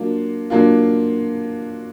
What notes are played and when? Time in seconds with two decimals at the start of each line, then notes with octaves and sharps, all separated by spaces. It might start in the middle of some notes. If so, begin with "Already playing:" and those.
Already playing: F#3 A#3 D4 F4
0.50 F#3 A#3 D4 F4